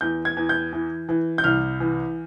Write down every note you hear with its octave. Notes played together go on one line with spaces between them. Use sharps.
E2 G6
G#6
E2
G6
E3
E3
G6
C2 F6
E3